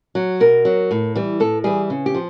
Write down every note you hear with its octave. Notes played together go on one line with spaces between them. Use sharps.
F#3
B2 A#4
F#3
A2
E3 G3
A2 A4
E3 G3 G#4
C#3
G4
F3